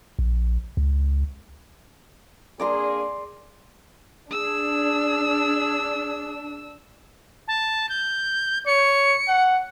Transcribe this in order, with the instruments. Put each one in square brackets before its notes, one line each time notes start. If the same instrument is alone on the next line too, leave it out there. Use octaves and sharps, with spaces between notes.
[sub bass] A#1
C#2
[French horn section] A#3 D4 G#4 [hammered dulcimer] D5 A#5 C6
[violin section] D4 [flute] G#4 [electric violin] E6
[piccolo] A5
G6
[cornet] C#5 [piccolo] C#7
[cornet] F#5